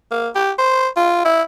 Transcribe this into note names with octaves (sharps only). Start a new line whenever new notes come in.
A#3
G4
C5
F4
E4